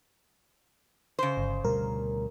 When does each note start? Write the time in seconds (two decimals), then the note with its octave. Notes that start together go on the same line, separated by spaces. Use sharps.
1.19 C#3 C5
1.37 G1
1.65 D2 B2 G3 A#4